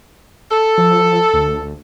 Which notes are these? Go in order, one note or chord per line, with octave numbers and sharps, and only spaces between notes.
A4
F3
D2